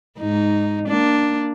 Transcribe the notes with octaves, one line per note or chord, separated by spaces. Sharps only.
G#2 D#4
A#3 D4